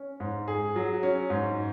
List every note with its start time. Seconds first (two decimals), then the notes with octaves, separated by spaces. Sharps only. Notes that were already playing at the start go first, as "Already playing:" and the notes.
Already playing: C#4
0.20 G#2
0.48 G#4
0.76 F#3
1.03 C#4
1.30 G#2